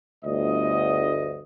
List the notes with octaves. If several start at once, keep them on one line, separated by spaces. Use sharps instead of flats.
G1 D2 D#5